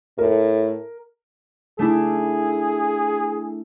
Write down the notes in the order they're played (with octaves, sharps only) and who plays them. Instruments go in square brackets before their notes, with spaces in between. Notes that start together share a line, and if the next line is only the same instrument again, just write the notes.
[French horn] A2 [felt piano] A#4
[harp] A3 D4 E4 [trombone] G#4